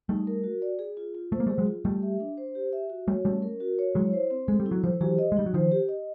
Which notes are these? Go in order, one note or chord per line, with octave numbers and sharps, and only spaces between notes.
G3 A3 D#4
A#4
F#4
D5
G#4
F4
F4
A3 C5
A#3
G3 A3 G#4
F#3 G#3
F4
G3 A3 G4
E5
D4
C5
G4
E5
F#4
G3 A3 C#5
G3 A3 C#4
A#4
F#4
C#5
F#3 G#3 E4
C5
C4
G#3 A4
G3
E4
F#3
F3 G3 C5
E3 F#3 G4
D#5
G#3
G3 D#4
F#3
D#3 F3 C5
G4
D#5